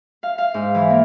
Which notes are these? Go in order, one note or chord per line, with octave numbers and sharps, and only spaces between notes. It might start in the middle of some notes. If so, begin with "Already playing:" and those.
F5
F5
G#2
E3
A#3